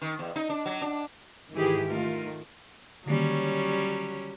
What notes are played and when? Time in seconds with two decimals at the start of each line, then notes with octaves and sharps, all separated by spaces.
0.02 D#3
0.19 E2
0.36 D#4
0.50 D4
0.66 F#3
0.82 D4
1.52 G#2 D#3 E3 E4 G4 G#4
1.88 D#3 A3 F4 A#4
3.06 D3 D#3 F#3 G3 A#3 C#4